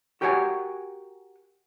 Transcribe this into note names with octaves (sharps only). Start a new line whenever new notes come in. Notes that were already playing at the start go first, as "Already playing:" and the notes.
F#4 G4 A#4 C#5 F#5 G#5